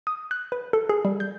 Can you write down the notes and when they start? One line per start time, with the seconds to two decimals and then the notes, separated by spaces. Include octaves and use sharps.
0.07 D#6
0.31 F#6
0.52 B4
0.73 A4
0.89 G#4
1.05 G3
1.20 G6